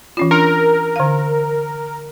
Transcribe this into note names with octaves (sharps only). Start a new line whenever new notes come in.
E3 C#4 F4
D4 A#4
D3 F5